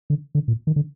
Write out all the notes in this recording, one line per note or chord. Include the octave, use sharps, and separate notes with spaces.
D3
D3
A#2
D#3
D3